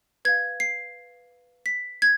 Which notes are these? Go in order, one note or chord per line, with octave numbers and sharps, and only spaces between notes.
B4 F5 G#6
C7
B6
G#6